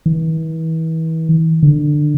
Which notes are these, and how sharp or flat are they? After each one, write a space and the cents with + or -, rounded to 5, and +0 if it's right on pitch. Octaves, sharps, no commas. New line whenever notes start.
E3 -35
D3 +20